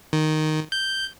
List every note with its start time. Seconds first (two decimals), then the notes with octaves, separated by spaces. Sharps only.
0.13 D#3
0.72 G6